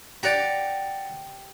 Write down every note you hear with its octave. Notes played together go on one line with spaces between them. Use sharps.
G4 D5 F#5 A#5